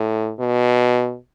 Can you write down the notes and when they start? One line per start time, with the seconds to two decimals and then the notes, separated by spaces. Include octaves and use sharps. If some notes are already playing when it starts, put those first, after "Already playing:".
Already playing: A2
0.40 B2